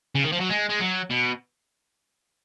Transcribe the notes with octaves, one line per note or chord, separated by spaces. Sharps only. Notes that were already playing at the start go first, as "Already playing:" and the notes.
C#3
D#3
F3
F#3
G#3
G#3
F#3
B2